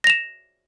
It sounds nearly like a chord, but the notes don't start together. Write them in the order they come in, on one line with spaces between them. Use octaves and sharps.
A#6 F7 E7